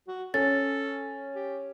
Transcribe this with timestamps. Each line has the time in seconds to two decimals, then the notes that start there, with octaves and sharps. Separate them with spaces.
0.08 F#4
0.34 C#4 A4 A6
1.35 G4